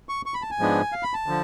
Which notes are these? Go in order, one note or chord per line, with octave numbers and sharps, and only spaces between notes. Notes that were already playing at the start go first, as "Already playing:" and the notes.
C#6
C#6
B5
A5
G#5
G#2 F3 G#3 B3 D4
F5
B5
A5
D3 F3